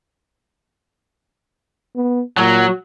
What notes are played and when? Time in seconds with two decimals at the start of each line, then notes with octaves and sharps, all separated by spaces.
1.96 B3
2.37 A#2 F#3